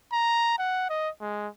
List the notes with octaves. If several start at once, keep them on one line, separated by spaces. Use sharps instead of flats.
A#5
F#5
D#5
G#3